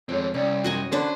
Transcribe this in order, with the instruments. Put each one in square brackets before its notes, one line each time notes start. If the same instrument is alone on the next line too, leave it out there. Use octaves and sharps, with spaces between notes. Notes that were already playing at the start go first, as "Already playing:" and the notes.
[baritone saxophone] F2 [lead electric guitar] G#3 C4 [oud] C#5
[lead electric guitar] C2 [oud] C3 D5 [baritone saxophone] C#4
[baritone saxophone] F#2 [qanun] F#4 D#5 G#5
[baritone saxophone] D3 [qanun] C#4 D4 B4 [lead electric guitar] C5